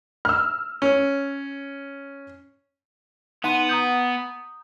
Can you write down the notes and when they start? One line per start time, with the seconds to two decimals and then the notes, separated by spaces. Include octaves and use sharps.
0.25 E6 F6
0.82 C#4
3.44 B3 D#4 F#5 C6 D#7
3.69 A#5 D#6 G6